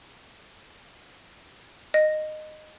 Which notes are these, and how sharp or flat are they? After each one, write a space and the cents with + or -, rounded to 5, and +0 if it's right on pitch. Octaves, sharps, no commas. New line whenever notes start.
D#5 -15